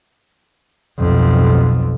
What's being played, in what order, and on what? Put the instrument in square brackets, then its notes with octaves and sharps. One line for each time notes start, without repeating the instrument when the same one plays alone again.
[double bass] B1 F2